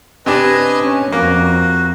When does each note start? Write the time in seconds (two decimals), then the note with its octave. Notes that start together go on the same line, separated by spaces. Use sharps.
0.26 C3 D4 B4 D#5 G#5
0.81 C#4
1.12 F2 A#3 F#4